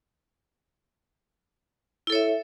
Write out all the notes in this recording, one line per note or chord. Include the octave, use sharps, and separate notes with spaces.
E4 A4 C#5 E5